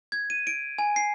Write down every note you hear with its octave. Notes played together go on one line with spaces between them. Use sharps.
G#6
D#7
D7
G#5
C7